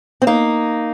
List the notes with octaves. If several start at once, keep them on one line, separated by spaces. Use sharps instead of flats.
C4
A#3 D#4